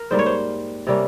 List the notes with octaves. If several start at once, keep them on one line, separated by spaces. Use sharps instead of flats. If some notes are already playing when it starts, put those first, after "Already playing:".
Already playing: A#4
G#2 G3 A#3 C5
C#5
C5
C3 G3 A#3 C#4